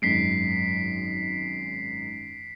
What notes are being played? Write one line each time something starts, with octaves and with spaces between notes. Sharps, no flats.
G#1 F#2 G#3 B6 C7 D7